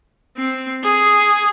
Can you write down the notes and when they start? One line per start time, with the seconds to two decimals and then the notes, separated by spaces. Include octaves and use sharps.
0.37 C4
0.83 G#4